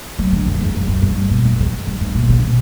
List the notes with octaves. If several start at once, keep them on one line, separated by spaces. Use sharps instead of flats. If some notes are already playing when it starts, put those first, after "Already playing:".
F#3
D3
F#2
E2
F#2
F#2
G2
A#2
F#2
E2
F#2
G2
G2
A#2
C#3
B2